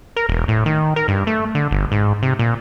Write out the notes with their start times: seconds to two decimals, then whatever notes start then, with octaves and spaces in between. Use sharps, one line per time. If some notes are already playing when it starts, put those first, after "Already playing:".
0.16 A#4
0.29 E1
0.48 A2
0.66 D#3
0.96 A#4
1.08 G2
1.27 A3
1.55 D3
1.71 G1
1.92 G#2
2.23 C3
2.39 A#2